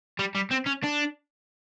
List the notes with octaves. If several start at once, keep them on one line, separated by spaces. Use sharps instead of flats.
G3
G3
C4
C#4
D4